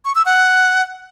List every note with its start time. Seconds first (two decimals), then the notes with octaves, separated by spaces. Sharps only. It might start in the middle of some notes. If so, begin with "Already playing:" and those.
0.05 C#6
0.15 E6
0.26 F#5